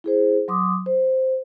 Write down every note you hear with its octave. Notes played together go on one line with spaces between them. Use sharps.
E4 G#4 C5
F#3 C6 D6 D#6
C5